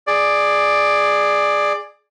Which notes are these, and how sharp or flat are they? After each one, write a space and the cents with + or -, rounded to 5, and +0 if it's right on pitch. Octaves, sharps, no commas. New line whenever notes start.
G#4 +0 D5 +10